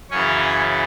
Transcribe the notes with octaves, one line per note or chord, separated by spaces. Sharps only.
F#2 C#3 E3 C#4 C#5